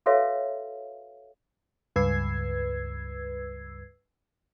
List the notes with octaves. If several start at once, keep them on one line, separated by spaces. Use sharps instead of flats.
F#4 A4 B4 C#5 E5 F5
C#2 G2 B4 E6 G#6 C7